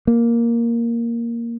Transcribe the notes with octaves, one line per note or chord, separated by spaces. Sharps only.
A#3